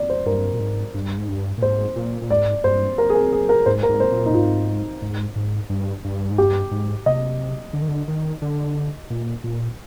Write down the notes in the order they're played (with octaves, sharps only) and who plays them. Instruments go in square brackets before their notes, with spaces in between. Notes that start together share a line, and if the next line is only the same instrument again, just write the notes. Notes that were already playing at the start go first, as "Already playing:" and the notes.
Already playing: [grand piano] D5
C5
[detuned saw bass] G2 [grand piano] A#4
[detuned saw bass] A#2
G#2
G2
G#2
G2
A#2
[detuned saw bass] G#2 [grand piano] C5
[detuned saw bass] A#2
A#2
[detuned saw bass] G#2 [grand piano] D5
[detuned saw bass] G2 [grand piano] C5
[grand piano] A#4
G#4
A#4
G#4
A#4
[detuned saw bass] G#2 [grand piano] C5
[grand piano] A#4
[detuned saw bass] G#2
[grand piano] C5
[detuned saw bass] A#2
[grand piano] D#4
[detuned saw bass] A#2
[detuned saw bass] G#2 [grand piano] F4
[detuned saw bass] G#2
G#2
G2
G2
G#2
[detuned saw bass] G2 [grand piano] G4
[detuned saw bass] G#2
[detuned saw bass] C3 [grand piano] D#5
[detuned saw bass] D3
D#3
D3
D#3
D3
A#2
A#2